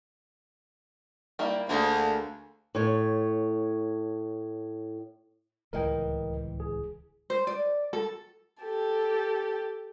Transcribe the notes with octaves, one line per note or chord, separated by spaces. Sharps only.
G3 A#3 E4
D2 A#3 D4 G#4
A2 C#5
D1 C#2 E3 A#4 D#5 G5
G#4
C5
D5
A4
G4 A4